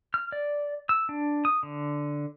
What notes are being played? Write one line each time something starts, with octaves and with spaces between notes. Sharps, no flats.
F6
D5
E6
D4
D#6
D3